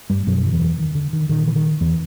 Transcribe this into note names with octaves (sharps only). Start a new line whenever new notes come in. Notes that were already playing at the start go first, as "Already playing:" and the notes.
G2 G3
F#2 B2 F#3
D#3
E2 E3
D#3
D3
D#3
A#2 D#3
E3
D#3
E2 E3